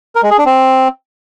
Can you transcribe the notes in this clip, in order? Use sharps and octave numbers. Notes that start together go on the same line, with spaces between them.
A#4
G#3
G#4
D4
C4